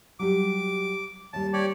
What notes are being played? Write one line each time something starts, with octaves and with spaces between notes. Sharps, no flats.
F#3 G3 G4 D6
D#2 G3 A5
G4 C#5 D5